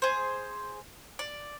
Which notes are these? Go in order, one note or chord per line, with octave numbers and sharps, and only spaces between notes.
G#4 C5
D5